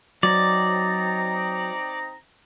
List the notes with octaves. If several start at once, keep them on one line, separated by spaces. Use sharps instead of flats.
F#3 C4 D#4 D5 A#5